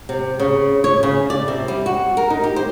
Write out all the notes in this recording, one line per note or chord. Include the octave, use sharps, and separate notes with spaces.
C3
C#3
C#5
C#3
D5
C3
G3
F#4
A#4
D#4
G4
C5